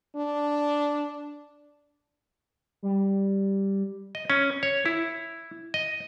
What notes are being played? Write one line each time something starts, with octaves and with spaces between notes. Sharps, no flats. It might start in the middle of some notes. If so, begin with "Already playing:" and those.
D4
G3
D#5
C#4
C#5
E4
D#5